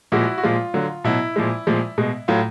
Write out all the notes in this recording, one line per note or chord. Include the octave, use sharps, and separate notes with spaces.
A#2 F3 G#3 E4 F#4
F#4
A#2 F3 G#3 F4
D3 F#3
B2 F#3 E4
A#2 F3 G#3
A#2 F3 G#3
B2 G#3
A2 F#3 F4